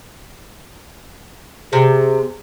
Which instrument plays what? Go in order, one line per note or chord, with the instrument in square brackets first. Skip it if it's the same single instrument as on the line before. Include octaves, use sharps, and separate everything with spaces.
[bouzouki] C3 [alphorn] G#4